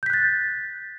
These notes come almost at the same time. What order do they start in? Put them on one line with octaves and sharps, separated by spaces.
G6 B6 F#6 A6